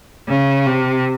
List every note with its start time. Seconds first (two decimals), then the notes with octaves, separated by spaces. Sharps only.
0.28 C#3
0.66 C3